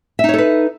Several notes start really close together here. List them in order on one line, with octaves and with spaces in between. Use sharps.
E5 D#4 C#5 A4 B4